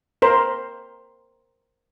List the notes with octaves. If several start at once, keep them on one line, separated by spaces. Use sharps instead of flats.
A#4 C5